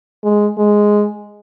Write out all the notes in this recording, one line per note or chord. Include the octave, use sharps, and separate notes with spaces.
G#3
G#3